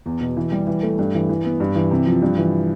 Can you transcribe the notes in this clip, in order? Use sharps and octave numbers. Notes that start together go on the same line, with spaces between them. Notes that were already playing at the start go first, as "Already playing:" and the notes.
E2
B2
E3
G3
E3
A3
G2
E3
E3
B3
G2
E3
C3
F3
G2
E3